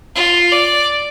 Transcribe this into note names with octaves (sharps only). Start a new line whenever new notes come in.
F4
D5